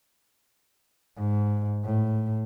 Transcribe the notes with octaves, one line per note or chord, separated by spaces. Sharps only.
G#2
A2